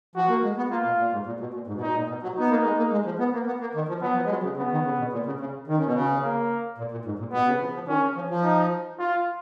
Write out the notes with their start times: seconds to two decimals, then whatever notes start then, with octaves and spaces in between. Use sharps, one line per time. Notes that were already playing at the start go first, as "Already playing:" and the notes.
0.16 F3 F#4
0.29 A#3
0.43 G#3
0.57 B3
0.70 A#3 F4
0.85 B2
0.98 A#2
1.12 G#2
1.26 A#2
1.40 B2
1.54 A#2
1.67 G#2
1.75 B2
1.81 A#2 D#4
1.95 A#2
2.09 B2
2.23 F#3
2.37 B3 D#4
2.50 A#3
2.64 G#3
2.77 A#3
2.92 G#3
3.05 F3
3.19 B3
3.33 A#3
3.47 B3
3.61 A#3
3.75 D#3
3.88 F3
4.02 F#3 B3
4.16 F3
4.25 G#3
4.30 F#3
4.43 C#3
4.57 C#3 B3
4.71 D#3
4.85 C#3
4.98 B2
5.13 A#2
5.26 C#3
5.40 C#3
5.67 D#3
5.76 C#3
5.85 B2
5.93 C#3
6.22 A#3
6.78 A#2
6.91 A#2
7.05 G#2
7.19 A#2
7.33 B2 B3
7.47 C#3
7.60 F3
7.74 F3
7.88 D#3 C#4
8.02 C#3
8.15 F3
8.30 F3
8.43 D#4
8.99 F4